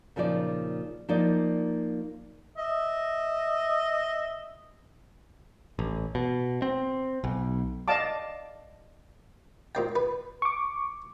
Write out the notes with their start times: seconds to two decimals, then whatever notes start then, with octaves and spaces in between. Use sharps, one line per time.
0.16 A#2 C#3 F3 D#4 D5
1.09 F3 A#3 D#4 D5
2.58 D#5 E5
5.79 A1
6.15 B2
6.62 C4
7.24 B1
7.88 D5 D#5 F5 A5 D6
9.75 A#2 C4 G5
9.96 B4
10.42 C#6 D6